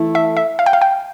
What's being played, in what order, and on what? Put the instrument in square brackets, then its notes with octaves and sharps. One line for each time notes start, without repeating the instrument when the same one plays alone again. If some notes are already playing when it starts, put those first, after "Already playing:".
Already playing: [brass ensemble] E3 A3 E4 A4
[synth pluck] E5
E5
F5
G5
F5
G5